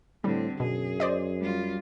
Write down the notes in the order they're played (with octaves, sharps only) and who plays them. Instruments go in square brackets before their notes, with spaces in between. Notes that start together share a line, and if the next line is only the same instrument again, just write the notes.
[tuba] A2 [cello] D3 C4 [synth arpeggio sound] G3
[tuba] F#2 [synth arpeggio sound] B2 [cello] G#4
[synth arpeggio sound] C5 D5 D#5
[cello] G3 F4